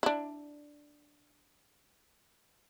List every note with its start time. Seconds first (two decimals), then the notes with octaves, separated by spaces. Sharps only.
0.03 D4 E4